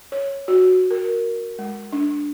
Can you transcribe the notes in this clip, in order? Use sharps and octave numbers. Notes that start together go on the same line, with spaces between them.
C#5
F#4
A#4
G#3
D4